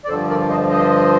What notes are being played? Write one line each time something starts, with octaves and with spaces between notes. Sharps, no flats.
D5
G2 D3 F3 A4 C5
A#4 D5
C5 D#5
C5 D#5